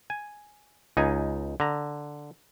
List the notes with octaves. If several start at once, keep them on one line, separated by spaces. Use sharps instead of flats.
G#5
C#2 D#4 G#5
D3 A#5